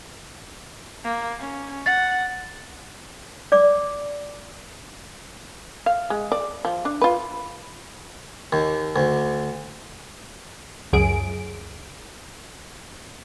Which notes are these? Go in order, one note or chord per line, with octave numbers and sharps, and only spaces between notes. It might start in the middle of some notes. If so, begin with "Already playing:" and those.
A#3
C#4
F#5 A6
D5 D6
F5
G#3
D5
F3
D4
F4 B4
D#2
D2
C#2 F#2 G#4 D7